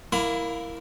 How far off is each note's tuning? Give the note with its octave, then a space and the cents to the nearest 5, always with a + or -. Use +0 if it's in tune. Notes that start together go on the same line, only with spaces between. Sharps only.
A#3 +0 E4 +0 B5 +35